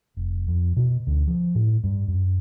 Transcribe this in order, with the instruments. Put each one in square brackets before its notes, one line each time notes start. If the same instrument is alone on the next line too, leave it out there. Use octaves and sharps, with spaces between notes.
[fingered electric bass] F1
F2
B2
D2
F3
A2
G2
F#2